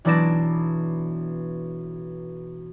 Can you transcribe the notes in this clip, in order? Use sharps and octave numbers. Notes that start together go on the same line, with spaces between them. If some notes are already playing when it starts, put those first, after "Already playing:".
B1 E3 D4 D5 A#6 E7